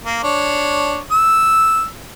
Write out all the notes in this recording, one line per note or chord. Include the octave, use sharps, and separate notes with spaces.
A#3
D4 C#5
E6